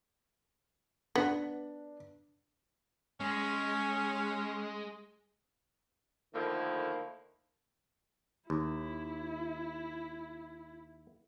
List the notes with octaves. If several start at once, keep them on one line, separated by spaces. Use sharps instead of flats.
B3 D4
G#3 C#4
D3 D#3 F3 A3 A#3 E4
D#2 E4